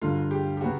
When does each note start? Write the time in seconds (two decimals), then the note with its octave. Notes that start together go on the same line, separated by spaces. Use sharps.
0.02 G2 D3 F#3 F4
0.31 G4
0.57 G4
0.61 C#3 F#3 B3 F#4